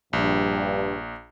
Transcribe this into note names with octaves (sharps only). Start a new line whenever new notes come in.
A#1 G2